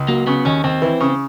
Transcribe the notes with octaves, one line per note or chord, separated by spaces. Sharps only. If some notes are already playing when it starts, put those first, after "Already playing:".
Already playing: C#2
F#3 A#3
C#3 B3
D#2 C#4
D#2 C4
E3
C#3